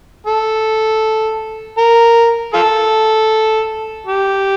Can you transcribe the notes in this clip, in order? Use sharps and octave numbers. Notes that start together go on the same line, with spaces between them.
A4
A#4
F4 A4
G4